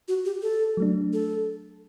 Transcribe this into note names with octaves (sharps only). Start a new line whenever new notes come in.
F#4
G4
A4
F#3 A3 D4
A4